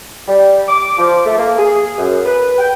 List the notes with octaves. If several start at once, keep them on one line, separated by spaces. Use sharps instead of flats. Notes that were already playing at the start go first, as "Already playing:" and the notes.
G3
D6
F3
A3
A#3
G#4
F#2
B4
G5